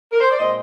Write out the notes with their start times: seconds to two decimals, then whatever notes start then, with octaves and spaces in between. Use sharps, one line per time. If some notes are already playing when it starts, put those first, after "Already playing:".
0.12 A#4
0.21 C5
0.30 D5
0.39 A#2 G#3 C4 C5 D#5